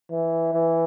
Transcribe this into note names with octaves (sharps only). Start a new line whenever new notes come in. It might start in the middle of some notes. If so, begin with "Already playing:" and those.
E3
E3